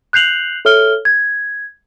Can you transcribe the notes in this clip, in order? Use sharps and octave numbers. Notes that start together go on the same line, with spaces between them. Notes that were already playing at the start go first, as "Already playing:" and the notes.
F#6 G6 C7 F7 F#7
A4 C#5 E5 F6 G7
G#6